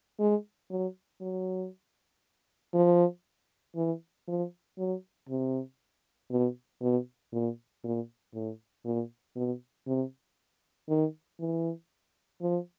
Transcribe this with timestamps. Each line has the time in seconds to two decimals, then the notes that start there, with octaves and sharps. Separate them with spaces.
0.19 G#3
0.71 F#3
1.21 F#3
2.74 F3
3.76 E3
4.28 F3
4.78 F#3
5.29 C3
6.31 B2
6.82 B2
7.33 A#2
7.84 A#2
8.34 A2
8.85 A#2
9.36 B2
9.87 C3
10.89 D#3
11.40 E3
12.42 F3